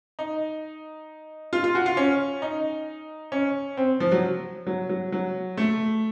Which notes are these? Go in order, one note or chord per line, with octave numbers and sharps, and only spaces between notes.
D#4
F4
F4
F#4
F4
C#4
D#4
C#4
C4
F3
F#3
F#3
F#3
F#3
A3